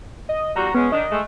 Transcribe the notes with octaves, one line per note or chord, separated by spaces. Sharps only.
D#5
E2 G3 F#4 A#5
G#3 B3 C#4
D#3 D4 D#5
G#3 A3